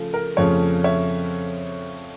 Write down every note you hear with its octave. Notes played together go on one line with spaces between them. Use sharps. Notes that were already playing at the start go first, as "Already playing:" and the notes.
Already playing: C#3 F3 A3
A#4
F2 C#3 F3 A3 C#5
C#5 E5